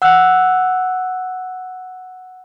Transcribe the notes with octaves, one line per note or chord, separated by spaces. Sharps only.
F#5 E6 F#6